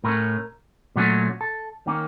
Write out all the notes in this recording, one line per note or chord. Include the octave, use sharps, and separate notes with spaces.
A2 A3 C#4 A#4
A#2 F#3 A3 C#4
A4
D#3 A#3 C#4